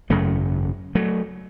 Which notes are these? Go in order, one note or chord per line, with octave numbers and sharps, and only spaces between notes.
G#1 F#2 C#3 F#3 A3
F#3 A3